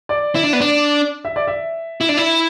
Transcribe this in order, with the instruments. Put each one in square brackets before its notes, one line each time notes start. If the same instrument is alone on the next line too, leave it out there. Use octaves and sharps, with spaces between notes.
[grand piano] D5
[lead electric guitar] E4
D4
B3
D4
[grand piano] E5
D5
E5
[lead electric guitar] E4
D4
E4